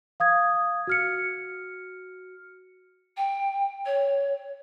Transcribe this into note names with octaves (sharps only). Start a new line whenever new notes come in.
F5 D#6 G#6
F#4 F6 C#7
G5
C#5